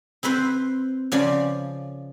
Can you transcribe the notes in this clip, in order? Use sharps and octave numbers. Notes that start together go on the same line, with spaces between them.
C4 E4 B4 C5
C#3 F3 D5